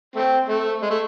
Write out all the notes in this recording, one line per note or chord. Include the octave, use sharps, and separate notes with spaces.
A3 C4
A3
G#3
A3